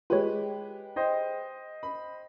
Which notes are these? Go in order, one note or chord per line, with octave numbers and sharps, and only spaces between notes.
G#3 F4 G4 B4 C#5
C5 D#5 G5
B5